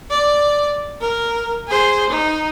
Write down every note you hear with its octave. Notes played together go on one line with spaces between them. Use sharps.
D5
A#4
G#4 C5
D#4